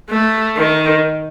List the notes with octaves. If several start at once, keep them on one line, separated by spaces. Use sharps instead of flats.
A3
D#3